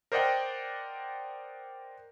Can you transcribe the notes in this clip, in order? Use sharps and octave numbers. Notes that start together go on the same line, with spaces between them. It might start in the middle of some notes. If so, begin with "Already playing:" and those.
A#4 C5 D5 D#5 F#5 G5